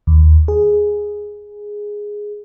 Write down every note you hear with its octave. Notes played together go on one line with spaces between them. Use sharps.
D#2
G#4